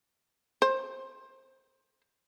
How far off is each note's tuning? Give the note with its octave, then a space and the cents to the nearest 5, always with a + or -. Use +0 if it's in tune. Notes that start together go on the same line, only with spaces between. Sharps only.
C5 +20